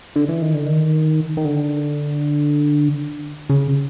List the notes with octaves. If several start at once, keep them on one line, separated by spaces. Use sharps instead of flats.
D3
E3
D#3
D3
D#3
D#3
D3
C#3